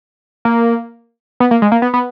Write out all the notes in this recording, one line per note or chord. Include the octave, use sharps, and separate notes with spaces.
A#3
B3
A#3
G#3
A#3
B3
B3